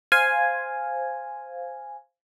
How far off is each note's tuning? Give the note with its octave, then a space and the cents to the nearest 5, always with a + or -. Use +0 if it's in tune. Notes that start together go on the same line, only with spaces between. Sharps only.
C5 +0 F5 +0 G#5 +0